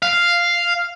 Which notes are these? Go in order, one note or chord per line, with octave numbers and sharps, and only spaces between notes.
F5